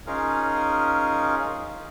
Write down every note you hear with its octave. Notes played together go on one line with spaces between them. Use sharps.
C#4 D#4 F4 G#4 A#4 F5